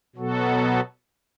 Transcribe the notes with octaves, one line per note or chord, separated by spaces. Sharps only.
B2 F#3 B3 F#4 A4